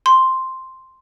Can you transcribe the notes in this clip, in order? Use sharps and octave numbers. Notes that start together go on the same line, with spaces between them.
C6